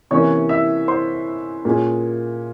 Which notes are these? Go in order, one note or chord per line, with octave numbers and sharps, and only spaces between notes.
C3 E3 A#3 C#4 C#5 C#6
E5 E6
C5 C6
A#2 G#3 C#4